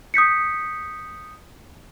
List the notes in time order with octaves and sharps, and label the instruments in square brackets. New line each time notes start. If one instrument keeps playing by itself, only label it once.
[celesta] D#6 G6 B6 C#7